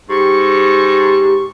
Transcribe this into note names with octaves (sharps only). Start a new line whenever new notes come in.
G#2 G4 C#6